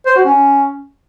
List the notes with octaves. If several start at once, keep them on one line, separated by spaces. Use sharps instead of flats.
C5
F#4
C#4